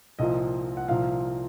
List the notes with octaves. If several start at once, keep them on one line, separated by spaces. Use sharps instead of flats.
C2 A#2 F3 D#5
F#5
C2 A#2 F3 F5